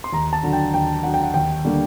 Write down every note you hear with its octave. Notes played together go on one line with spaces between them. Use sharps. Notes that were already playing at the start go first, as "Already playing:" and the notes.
C6
D#2 A#5
A5
D3 F#3
G5
D#2 G5
D3 F#3 F#5
G5
F#5
D#2 G5
D3 G3 A#3 D4